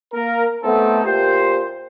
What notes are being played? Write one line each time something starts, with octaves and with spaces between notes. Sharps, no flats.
A#3 A#4
A3 B3 C4 D#4 A4
A#2 G4 C5